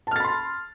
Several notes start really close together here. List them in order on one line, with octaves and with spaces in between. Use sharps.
A5 F6 A6 B5 C6